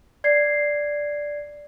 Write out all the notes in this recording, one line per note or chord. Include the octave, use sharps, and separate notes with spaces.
D5 G#6 C7